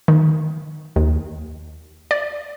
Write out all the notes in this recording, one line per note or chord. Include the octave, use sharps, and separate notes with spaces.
D#3
D#2
D5